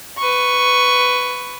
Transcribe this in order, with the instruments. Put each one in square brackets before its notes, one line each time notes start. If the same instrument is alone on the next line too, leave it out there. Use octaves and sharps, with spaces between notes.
[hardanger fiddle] B4 C#6